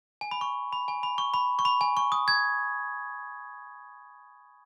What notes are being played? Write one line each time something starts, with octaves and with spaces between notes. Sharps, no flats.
G#5
B5
C#6
B5
G#5
B5
C#6
B5
C#6
B5
G#5
C#6
D#6
G#6